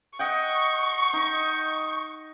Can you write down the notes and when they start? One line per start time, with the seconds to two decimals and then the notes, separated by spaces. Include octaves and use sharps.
0.19 D#5 F#5 G5 C#6
1.13 D#4